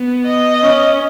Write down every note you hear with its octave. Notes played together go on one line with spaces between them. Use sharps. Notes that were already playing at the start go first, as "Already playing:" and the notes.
Already playing: B3
D#5
C#4